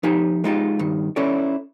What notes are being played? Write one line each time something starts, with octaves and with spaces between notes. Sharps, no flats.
F3 D#4 G4 G#5
G#3 D#4 F4 G4
G2 D#3
C#4 E4 A4 C#5 D5